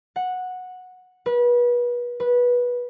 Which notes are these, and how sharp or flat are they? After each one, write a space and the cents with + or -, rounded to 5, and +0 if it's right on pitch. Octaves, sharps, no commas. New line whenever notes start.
F#5 -10
B4 -30
B4 -15